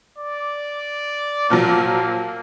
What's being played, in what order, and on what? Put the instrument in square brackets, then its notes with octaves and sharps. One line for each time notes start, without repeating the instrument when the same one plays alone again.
[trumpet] D5
[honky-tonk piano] A#2 F3 F#3 [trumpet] A#3